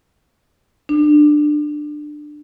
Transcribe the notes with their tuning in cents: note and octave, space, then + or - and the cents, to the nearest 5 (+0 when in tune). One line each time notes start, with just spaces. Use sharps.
D4 +20